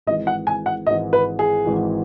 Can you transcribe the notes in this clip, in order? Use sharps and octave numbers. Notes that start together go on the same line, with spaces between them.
G#1 G#2 E3 D#5
F#5
G#5
F#5
G#1 G#2 E3 D#5
B4
G#4
G#1 G#2 E3